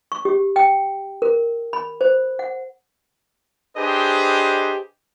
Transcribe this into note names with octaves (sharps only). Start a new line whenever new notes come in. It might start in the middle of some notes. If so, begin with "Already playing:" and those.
C#6
G4
G5
A#4
B5
C5
F#5
D4 G4 G#4 B4 C5 D#5